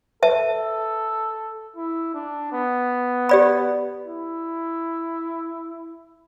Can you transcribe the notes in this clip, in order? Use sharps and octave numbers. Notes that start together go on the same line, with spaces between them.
A4 B4 E5 A5
E4
D4
B3
G4 D5 B5
E4